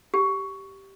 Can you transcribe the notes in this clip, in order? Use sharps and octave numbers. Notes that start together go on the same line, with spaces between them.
G4